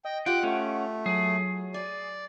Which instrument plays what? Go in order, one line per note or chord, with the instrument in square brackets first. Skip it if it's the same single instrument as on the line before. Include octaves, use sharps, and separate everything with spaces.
[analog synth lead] D#5 [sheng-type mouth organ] G5
[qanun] F4 G4 [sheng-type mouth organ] F#5 F#6 [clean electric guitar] G5
[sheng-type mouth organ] A3 [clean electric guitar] C#4 [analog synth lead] F#5
[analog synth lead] F#3 [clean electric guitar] G#4
[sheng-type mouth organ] D5 [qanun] G#5